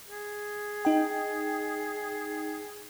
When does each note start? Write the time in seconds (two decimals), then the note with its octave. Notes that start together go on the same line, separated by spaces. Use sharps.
0.08 G#4
0.85 D#4 G5